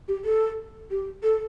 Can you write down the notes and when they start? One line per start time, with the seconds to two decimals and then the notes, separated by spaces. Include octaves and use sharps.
0.08 G4
0.25 A4
0.91 G4
1.23 A4